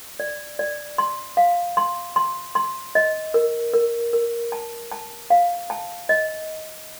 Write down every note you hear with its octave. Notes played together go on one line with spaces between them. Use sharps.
D5
D5
C6
F5
C6
C6
C6
D#5
A#4
A#4
A#4
A5
A5
F5
A5
D#5